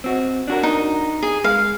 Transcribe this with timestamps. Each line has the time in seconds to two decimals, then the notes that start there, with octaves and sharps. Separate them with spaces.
0.04 C4 F#4
0.48 D4 F#4 A#4
0.63 D#4
1.23 G#4
1.44 G#3 F5